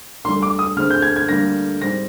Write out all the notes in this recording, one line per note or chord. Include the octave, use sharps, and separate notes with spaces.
D2 D3 G3 C6
D6
D#6
D2 D3 G#3 C4 F6
G6
G#6
G#6
D2 D3 G3 A#3 A#6
G#2 G3 C4 A#6